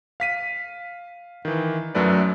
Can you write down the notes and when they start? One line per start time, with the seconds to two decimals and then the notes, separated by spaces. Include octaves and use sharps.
0.20 F5 B6 D#7
1.45 D#3 E3
1.95 F#2 F#3 A3 A4 B4 D5